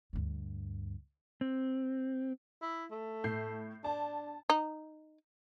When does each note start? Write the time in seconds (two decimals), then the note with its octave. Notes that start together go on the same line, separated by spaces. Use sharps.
0.13 D2 G2
1.41 C4
2.62 E4
2.91 A3
3.24 A2 G6 C7
3.84 D4 A5
4.50 D#4